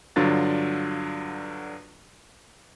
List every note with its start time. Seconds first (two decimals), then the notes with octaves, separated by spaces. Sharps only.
0.16 G2 D3 F#3 D4 F4 A6